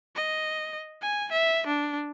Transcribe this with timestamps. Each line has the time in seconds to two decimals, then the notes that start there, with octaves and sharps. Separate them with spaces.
0.16 D#5
1.02 G#5
1.32 E5
1.67 D4